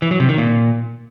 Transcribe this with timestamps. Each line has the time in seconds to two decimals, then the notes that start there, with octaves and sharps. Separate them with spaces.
0.02 E3
0.11 F#3
0.20 C3
0.29 D#3
0.38 A#2